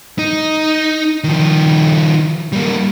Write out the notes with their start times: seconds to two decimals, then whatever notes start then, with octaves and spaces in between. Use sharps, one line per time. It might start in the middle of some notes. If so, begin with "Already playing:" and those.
0.19 D#4
1.24 D#3 F3
2.52 G3 A#3